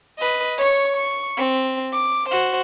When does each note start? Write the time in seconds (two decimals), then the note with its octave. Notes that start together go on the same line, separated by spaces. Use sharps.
0.18 B4 D#5
0.58 C#5 C#6
0.96 C#6
1.37 C4
1.92 D6
2.29 F#4 C5